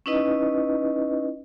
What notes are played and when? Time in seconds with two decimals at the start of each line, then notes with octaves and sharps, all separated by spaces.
0.06 C#4 D#4 E4 B4 D#5